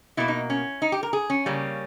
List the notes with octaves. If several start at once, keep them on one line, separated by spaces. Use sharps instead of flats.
B2 A#3 E4
D#4
C#4
D#4
G4
A#4
G#4
C#4
C#3 G3 A#3